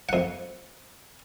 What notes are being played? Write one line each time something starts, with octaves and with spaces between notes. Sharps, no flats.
F2 F#5